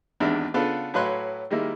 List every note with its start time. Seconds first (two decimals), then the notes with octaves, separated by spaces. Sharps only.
0.20 G#1 E2 G2 D4 E5
0.54 C#3 B3 D4 F4 A4 B4
0.94 A2 F#3 B4 F5 C6 F#6
1.51 D#3 G3 G#3 A#3 E4